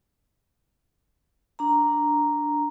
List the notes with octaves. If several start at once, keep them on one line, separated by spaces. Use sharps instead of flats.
D4 A#5